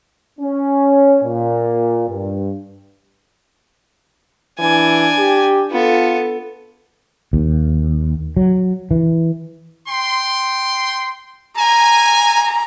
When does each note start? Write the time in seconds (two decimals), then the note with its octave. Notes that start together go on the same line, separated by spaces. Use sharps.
0.40 C#4
1.23 A#2
2.09 G2
4.59 E3 D4 G#5
5.18 G4
5.72 B3 F4 A4
7.33 D#2
8.37 F#3
8.91 E3
9.87 G5 C6
11.57 G#5 A#5